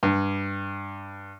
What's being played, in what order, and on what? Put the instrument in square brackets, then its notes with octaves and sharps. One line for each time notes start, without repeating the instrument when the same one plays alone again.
[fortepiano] G2